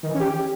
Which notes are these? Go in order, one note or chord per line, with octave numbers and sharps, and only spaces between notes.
D#3
E3
C#4
G4